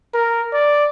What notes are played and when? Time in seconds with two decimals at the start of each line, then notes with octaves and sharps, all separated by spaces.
0.14 A#4
0.53 D5